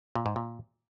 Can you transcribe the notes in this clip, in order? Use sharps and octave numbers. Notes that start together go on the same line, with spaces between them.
A#2
G#2
A#2